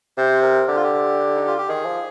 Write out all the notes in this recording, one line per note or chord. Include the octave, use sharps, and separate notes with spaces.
C3 C5
A#4
D3 G4
F4
G4
D#4
F4
G4
D#3 G#4
F3